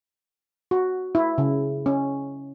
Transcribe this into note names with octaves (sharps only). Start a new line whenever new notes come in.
F#4
E4
C#3
C#4